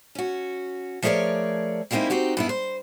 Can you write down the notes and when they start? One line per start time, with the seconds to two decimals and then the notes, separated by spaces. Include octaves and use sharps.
0.15 C#4 F#4
1.02 F3 A3 G#4 A#4 C#5 D5
1.91 G3 G#3 A#3 C4 D#4 E4
2.10 C4 D#4 F#4 G4
2.37 G2 B3 E4
2.49 C5